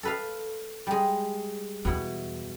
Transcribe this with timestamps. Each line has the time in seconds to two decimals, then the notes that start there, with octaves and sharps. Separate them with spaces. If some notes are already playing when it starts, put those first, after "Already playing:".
0.03 A4 B4 F5
0.87 G3 G#3
1.85 E2 B2 E4